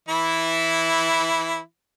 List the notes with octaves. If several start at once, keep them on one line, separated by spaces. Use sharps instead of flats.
E3 E4 B5